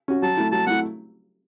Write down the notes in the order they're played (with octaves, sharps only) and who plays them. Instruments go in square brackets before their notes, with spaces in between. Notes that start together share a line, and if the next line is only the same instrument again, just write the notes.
[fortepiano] C#4 F#4
[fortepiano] F#3 [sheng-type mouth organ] A5
[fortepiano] A3 E4
[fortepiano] F#3 [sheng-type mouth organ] A5
[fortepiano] A3 E4 [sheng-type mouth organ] F#5